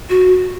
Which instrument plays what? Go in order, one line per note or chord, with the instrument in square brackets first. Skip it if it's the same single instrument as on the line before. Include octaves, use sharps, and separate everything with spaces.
[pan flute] F#4